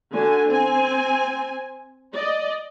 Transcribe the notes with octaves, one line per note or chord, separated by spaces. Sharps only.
D3 F#4 G#5
C4 G#5
D5 D#5